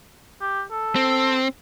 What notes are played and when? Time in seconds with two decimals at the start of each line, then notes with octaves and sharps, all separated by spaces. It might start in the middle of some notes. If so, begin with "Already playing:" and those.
0.41 G4
0.71 A4
0.96 C4